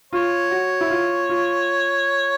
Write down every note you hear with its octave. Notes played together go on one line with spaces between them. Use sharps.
F4 C#5
F#4
E4
F4
F4